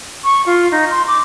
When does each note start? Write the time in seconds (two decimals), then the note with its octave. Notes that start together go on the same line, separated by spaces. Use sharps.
0.24 C#6
0.46 F4
0.71 D#4
0.91 C6
1.08 D6